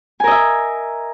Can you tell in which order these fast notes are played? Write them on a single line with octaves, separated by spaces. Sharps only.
G#5 A#4 D#5 E5